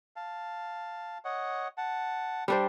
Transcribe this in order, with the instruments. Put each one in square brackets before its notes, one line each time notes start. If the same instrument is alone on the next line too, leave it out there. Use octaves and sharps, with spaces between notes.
[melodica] F5 A5
C#5 D#5 F#5
F#5 A5
[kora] G3 D4 C5